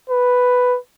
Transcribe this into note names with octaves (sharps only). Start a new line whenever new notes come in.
B4